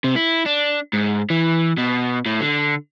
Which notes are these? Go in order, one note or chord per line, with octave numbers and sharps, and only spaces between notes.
C3
E4
D4
G#2
E3
B2
A2
D3